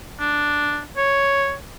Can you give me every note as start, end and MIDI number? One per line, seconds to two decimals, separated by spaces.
0.20 0.81 62
0.97 1.54 73